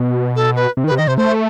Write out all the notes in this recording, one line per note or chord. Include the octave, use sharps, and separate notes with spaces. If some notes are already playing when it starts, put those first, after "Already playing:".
Already playing: B2
A4
B4
C3
D#3
B4
C3
D#3 D#5
C3 C5
A3 C5